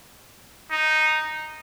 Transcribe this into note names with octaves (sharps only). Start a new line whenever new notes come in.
D#4